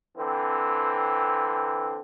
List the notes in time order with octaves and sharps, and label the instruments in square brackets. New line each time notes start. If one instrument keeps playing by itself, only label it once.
[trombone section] D3 E3 C4